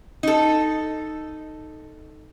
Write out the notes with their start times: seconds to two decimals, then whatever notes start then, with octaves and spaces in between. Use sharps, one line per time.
0.23 D#4 A4